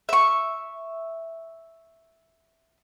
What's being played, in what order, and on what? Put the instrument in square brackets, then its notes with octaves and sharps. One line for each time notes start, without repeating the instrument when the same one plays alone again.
[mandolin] E5 C#6